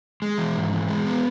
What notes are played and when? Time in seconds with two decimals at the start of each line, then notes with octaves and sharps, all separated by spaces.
0.22 G#3
0.38 E3
0.56 G#2
0.72 E3
0.88 G#3
1.06 B3